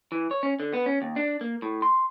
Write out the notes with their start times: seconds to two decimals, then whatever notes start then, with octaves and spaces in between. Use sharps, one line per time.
0.12 E3
0.31 C#5
0.43 C#4
0.60 D3
0.73 B3
0.86 C#4
1.02 D#2
1.16 D4
1.41 A#3
1.62 A2
1.82 C6